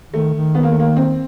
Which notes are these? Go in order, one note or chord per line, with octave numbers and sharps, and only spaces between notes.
D#3 A3
D#3
B3
A#3
A3
A#3
C4